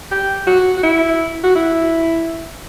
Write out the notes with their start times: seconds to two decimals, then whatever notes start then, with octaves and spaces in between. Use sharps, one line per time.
0.11 G4
0.47 F#4
0.77 F#4
0.83 E4
1.44 F#4
1.55 E4